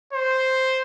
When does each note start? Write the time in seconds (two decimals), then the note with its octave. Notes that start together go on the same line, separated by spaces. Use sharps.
0.13 C5